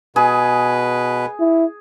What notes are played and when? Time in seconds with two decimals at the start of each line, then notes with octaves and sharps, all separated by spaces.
0.16 B2 G#4 B4
1.40 E4